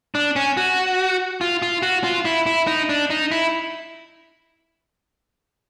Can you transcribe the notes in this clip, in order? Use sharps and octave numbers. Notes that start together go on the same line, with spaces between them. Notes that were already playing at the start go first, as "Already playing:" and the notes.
D4
C#4
F#4
F4
F4
F#4
F4
E4
E4
D#4
D4
D#4
E4